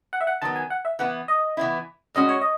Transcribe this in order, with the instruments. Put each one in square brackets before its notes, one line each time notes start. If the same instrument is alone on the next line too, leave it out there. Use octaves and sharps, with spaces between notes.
[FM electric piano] F#5
E5
F#5
[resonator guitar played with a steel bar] D#3 F#3 B3 [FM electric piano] A5
[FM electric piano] G#5
F#5
E5
[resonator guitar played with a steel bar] E3 B3 E4 [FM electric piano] F#5
[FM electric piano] D#5
[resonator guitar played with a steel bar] E3 B3 E4
[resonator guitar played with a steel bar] A2 G#3 C#4 F#4 [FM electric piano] D#5
[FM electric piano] C#5
D#5